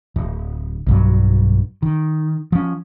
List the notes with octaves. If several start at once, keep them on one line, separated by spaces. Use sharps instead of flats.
D1
B1 G2 F#3
D#3
F3 C#4